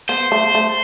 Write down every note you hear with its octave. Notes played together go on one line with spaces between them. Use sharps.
B3 C5
A3
A3